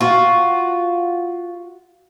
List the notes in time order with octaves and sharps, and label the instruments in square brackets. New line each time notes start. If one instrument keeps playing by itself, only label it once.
[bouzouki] F4 F#4